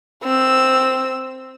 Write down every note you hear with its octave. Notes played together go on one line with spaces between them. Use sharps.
C4 E6